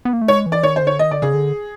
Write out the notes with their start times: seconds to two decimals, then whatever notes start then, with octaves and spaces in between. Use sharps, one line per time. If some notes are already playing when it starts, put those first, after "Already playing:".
0.05 B3
0.13 A#3
0.21 A3
0.28 G#3 C#5
0.46 E3
0.52 D5
0.63 D#3 C#5
0.76 C5
0.82 D3
0.87 C#5
0.99 D#3 D#5
1.11 D3 D5
1.22 C#3 G#4
1.34 D3